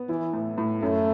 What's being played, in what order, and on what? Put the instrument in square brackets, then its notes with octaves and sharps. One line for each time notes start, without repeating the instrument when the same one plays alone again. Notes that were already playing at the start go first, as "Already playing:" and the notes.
Already playing: [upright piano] B3
[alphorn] E3 [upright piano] E4
[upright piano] A2
A2
[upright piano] F#2 [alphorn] A3